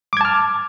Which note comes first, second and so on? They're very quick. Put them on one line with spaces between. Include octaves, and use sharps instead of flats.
D6 G#6 A5 F6